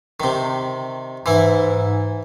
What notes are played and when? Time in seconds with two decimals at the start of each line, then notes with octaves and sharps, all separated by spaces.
0.20 C3 D#3
1.26 G#2 E3 E4